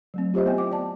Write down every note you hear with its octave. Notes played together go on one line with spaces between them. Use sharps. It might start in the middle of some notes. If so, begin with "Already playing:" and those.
F#3 A3 C4
F4 G4 C5 D#5 E5
B3 C4 E4 G5 G#5
D6
D5 A5